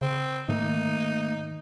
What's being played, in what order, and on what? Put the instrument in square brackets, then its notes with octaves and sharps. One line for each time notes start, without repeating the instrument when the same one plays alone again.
[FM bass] C#3 [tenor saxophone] C4
[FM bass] G#2 [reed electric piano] D#3 [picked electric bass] A3 A#3 [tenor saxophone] D#4